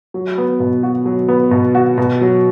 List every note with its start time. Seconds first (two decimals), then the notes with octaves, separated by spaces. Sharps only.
0.14 F#3
0.38 B3
0.60 B2
0.83 F#4
1.06 F#3
1.28 B3
1.51 B2
1.75 F#4
1.98 B2
2.21 F#3